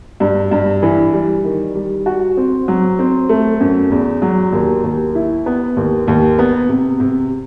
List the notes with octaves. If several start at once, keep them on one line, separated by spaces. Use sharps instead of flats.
G2
G2
E3
G3
D#3
G3
F#4
C4
F#3
C4
A3
F#2
E2
F#3
D#2
D#2
E4
B3
D#2
D#2
B3
C3
C3